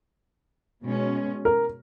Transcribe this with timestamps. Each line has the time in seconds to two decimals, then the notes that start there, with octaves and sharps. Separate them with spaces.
0.83 B2 G#3 C#4
1.45 A#4